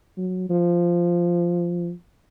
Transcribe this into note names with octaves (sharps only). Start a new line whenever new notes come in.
F#3
F3